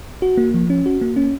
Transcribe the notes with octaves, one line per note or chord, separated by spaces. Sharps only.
F#4
A#3
F3
C#4
F#4
A#3
C#4